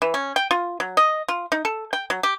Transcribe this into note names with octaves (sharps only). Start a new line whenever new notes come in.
E3
C#4
G5
F4
F#3
D#5
F4
D#4
A4
G5
F#3
G4